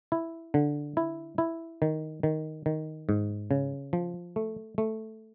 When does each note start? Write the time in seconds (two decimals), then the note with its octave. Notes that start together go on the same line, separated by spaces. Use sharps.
0.12 E4
0.54 D3
0.97 E4
1.38 E4
1.82 D#3
2.23 D#3
2.66 D#3
3.09 G#2
3.51 C#3
3.93 F3
4.36 A3
4.78 A3